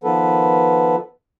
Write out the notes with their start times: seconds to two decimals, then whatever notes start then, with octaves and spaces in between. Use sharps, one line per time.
0.04 D#3 F3 B3 A4 B4